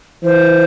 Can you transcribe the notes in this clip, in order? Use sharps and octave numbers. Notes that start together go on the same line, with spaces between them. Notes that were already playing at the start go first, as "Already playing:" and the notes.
E3 C5